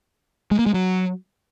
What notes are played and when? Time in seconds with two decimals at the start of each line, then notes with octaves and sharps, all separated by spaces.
0.51 G#3
0.59 A#3
0.66 G#3
0.74 F#3